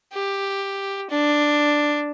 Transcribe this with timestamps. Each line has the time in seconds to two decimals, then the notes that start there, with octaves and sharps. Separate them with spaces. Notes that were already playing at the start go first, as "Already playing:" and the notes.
0.13 G4
1.10 D4